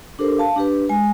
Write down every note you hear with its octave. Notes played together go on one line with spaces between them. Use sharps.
D4 G4 A4 A#4 C5
F5 A5
D4 G4 B4
G#3 G#5